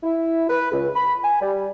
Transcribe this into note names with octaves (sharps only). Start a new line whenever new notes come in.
E4
B4
C#2
B5
G#5
G3